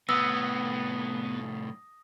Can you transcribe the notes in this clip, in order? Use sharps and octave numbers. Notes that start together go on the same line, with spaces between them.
C2 A2 B3 D#6 E6 A#6